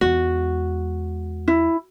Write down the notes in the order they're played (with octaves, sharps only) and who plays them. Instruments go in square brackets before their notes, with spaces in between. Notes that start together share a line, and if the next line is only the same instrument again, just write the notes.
[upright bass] E2 G#3 [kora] F#4
[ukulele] E4